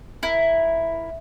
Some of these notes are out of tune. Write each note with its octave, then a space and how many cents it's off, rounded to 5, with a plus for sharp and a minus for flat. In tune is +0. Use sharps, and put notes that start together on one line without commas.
E4 +0 A#4 +15